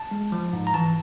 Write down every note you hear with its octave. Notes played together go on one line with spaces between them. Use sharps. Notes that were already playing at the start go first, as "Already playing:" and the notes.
Already playing: A5
G#3
F3
G#2
A#5
E3 A5